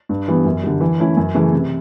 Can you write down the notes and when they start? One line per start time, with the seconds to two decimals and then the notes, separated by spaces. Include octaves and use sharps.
0.09 G2
0.28 E3 G3 B3
0.45 F#2
0.63 D3 G3
0.81 E3
1.00 A3 C#4 E4
1.17 F#2
1.35 C#3 E3 A3
1.52 C3